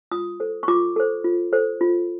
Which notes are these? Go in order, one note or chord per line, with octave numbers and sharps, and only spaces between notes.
F4 D#6
A4 C5
C#6
F4 D6
A4 C5
F4
A4 C5
F4